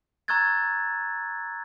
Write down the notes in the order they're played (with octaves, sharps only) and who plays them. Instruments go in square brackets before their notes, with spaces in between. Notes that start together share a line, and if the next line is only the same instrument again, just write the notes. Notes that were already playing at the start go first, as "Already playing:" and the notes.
[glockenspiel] A#5 C#6 E6 F#6 G#6 A6